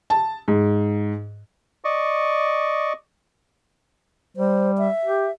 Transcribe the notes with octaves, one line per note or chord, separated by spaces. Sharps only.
A5
G#2
D5 D#5 C#6
G3 C5
E5
G4